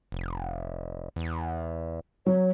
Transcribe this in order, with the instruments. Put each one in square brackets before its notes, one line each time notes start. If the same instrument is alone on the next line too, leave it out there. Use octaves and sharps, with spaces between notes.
[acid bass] F1
E2
[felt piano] F#3 [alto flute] C#5